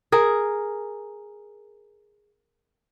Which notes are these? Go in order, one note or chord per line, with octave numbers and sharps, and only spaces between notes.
G#4 A#4